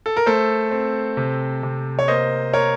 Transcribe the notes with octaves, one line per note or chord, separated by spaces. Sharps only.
A4
A#4
A3 A4 C5
C4
C3
C3
C#5
A#3 C5 D#5
A#3 A#4 C#5